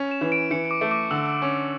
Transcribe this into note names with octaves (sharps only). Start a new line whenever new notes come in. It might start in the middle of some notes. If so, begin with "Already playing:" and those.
Already playing: C#4
E7
E3
D7
E3 C#7
D6
A3
D6
D3 E6
C#4